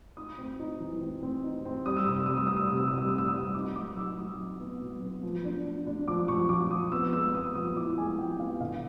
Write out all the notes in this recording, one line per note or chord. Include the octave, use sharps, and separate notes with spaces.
D#4 D#6
C4
D#4
E3
C4
C4
D#4
C4
G3 D#6
E6
C3 D#6
E6
G3 D#6
E6
G3 D#6
E6
C3 D#6
E6
G3 D#6
E6
C4 D#6
E6
D#6
G3
D#4 D6
F#3 D6
D#4 E6
F#3 D#6
D#4
B3
F#3
B3
F3
D4
D4
D4
F3 D6
F3 C#6
F3 D6
F3 D#6
B3 E6
G#3 E6
E6
B3 D#6
F3 D#6
E4 D6
G#3 G#5
F3 G5
B3 F5
D3 F5